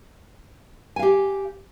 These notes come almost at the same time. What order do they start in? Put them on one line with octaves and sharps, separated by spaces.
G#5 F5 G4